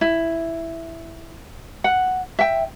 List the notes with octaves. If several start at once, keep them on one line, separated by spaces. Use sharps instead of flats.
E4
F#5
E5 G5